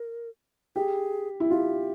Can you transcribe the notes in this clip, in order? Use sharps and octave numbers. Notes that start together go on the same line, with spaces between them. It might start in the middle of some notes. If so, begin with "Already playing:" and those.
Already playing: A#4
G4 G#4
E4
F4 G4